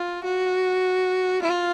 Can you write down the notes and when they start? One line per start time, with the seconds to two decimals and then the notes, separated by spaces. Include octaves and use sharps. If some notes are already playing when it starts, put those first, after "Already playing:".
Already playing: F4
0.24 F#4
1.42 F4